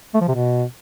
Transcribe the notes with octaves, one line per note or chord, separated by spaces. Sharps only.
A3
F3
C3
B2